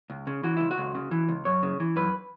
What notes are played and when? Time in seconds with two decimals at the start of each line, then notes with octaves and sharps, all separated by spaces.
0.10 C#2
0.27 C#3
0.43 E3 F#4
0.57 C#2 E4
0.71 F#4
0.78 C#2
0.95 C#3
1.11 E3
1.29 C#2
1.45 F#2 C#5
1.63 C#3
1.80 E3
1.96 F#2 B4